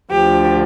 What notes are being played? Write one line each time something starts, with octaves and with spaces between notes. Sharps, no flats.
D2 D3 F3 G4